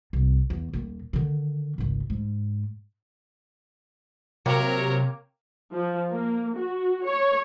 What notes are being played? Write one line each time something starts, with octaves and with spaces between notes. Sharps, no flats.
C2
E2
D#1 D#2
D3 D#3
G#1 C#2
G#2
C3 F#3 A#3 A#4 C#5 G5
F3
A#3
F#4
C#5